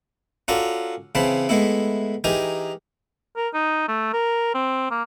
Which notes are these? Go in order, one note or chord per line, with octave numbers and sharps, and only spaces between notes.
C#4 F4 F#4 A4 A#4 D5
C#3 E3 C4 A5 B5
G#3 A3 B3 E4
E3 D#4 G4 G#4 A#4
A#4
D#4
A3
A#4
C4
A#3